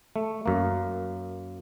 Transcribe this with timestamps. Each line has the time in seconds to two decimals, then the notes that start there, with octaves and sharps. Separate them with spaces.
0.16 A3
0.46 F#2 A#3